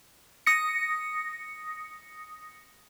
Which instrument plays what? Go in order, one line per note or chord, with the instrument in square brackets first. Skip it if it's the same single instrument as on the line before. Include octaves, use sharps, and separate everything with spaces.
[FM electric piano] D#6 A#6 C#7